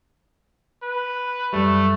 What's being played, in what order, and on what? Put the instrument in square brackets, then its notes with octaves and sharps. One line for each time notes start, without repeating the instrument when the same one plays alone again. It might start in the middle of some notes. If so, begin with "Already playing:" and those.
[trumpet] B4
[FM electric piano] F#2 G3 [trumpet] A3